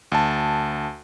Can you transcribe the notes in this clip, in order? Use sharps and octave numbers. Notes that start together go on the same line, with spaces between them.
D2 A5